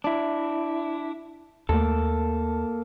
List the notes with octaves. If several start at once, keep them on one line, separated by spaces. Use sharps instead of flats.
D4 E4
D#2 A3 A#3 A4